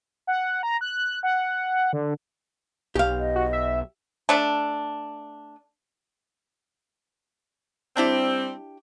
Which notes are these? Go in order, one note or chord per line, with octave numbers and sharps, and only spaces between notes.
F#5
A#5
F#6
F#5
D3
B1 G4 F5
D#5
F#4
E5
A3 D4
G3 C4 D4 E4 G4